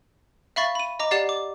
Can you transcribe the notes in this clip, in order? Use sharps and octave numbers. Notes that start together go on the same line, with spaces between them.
E5 F5 B5 C#6 A6
B5 D#7
D#5 A#5 D6
G4 D5 F#5 A6 C7
D6